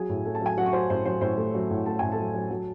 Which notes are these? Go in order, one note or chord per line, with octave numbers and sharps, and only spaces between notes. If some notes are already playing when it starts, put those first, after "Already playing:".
Already playing: F#3 G#4 G#5
A2
A3
A5
F#3 G#5
F#3 F#4 F#5
C#6
F#3 C5 C6
A2 C5 C6
F#3 C5 C6
A2 C5 C6
A3
F#3
A2
A3 A5
A2 G#5
A4 A5
F#3
F#3
F#3